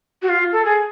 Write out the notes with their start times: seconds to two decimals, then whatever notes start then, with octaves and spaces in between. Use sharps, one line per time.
0.22 F#4
0.29 F4
0.52 A4
0.65 G#4